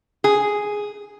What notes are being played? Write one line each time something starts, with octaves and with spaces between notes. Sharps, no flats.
G#4